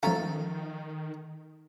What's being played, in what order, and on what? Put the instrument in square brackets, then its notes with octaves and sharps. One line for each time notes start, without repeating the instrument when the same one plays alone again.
[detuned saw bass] D#3 [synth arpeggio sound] F3 E5 [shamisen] C#4 F4 A#5 [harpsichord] A4